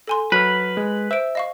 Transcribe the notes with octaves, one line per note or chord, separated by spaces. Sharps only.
A4 G#5 C6
F#3 B4 F6
G#3
C5 E5 D7
D#5 F5 C#6